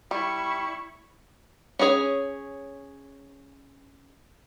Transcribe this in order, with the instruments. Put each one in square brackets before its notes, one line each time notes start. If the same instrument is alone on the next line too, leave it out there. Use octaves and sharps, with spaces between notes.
[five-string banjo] G3 [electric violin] E4 C#6
[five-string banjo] C#4 F4 G#4 C#5 G#5